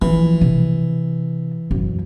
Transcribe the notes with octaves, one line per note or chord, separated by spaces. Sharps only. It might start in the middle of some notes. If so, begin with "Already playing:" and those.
E3 F3
C3
F#2